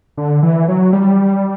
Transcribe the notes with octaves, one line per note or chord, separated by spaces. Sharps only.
D3
E3
F#3
G3